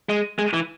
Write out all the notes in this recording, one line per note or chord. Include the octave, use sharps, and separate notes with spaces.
G#3
G#3
E3